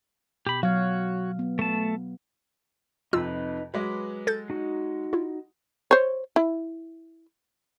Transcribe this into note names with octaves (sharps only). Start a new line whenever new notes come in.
B2 G4 B5
F#3 F#4 C#5 F5
B3
A3 A5
F2 C3 D#4 F4 B4 E6
F#3 G#3 B4 B5 D6
A4 G6 A6
D#4 F#4
E4 F4
C5 C#5
E4